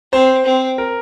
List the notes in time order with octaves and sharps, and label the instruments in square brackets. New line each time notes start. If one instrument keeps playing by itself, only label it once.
[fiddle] C4 [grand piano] C5
[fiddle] C4
[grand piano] A#4